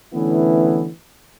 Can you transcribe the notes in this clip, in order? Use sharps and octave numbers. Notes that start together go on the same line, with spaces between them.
D3 E3 A3 B3 C#4 E4